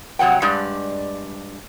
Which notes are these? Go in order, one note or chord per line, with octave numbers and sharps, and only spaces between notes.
C3 F#3 F#5 G5
G2 G#3 G4 D5